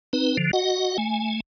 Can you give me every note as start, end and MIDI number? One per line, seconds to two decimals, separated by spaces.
0.13 0.37 60
0.13 0.37 63
0.13 0.37 71
0.37 0.51 50
0.37 0.51 53
0.53 0.97 66
0.53 0.97 75
0.53 0.97 78
0.98 1.40 57
0.98 1.40 80